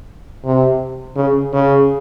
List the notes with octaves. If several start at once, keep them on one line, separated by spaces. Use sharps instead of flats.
C3
C#3
C#3